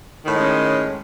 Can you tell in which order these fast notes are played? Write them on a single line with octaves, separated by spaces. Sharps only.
D#3 A2 G#3 C#4